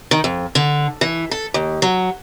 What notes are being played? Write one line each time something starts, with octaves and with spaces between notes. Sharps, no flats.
D#3
F2
D3
E3
A4
D#2
F#3